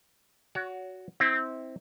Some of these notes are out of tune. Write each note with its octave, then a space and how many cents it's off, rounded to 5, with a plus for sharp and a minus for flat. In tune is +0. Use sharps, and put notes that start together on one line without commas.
F#4 +0 C#5 +35
C4 +0 E4 -30